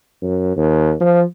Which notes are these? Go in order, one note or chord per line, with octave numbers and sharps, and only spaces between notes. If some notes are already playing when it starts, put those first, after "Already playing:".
F#2
D#2
F3